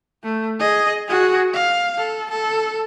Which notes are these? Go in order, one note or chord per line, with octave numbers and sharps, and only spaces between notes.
A3
G#4 D#5
F#4 G#4
F5
A4
A4